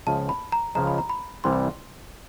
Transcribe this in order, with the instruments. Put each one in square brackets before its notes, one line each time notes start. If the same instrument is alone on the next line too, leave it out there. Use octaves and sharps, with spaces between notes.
[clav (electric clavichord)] C#2 C#3 F3 G#3 [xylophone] A5
[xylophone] B5
A#5
[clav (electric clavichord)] C#2 C#3 F3 G#3 [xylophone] A#5
[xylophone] B5
A#5
B5
[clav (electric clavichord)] C2 C3 E3 G3 [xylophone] C6